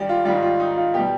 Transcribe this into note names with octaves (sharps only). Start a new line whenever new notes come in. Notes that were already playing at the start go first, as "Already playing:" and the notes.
Already playing: G2 D#3 G3 G4 D5
F4
G#2 D#3 G3 F4
F4
D#4
F4
B2 G3 G4